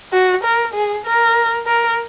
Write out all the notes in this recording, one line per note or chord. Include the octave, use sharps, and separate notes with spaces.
F#4
A#4
G#4
A#4
A#4